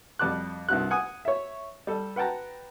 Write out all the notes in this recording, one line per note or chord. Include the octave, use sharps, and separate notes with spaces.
F2 G3 A5 D6 F#6
C2 G2 F#4 F#6
F#5 G#5 D#6
C#5 E5
G3 A4
B4 F#5 G5 A5 A#5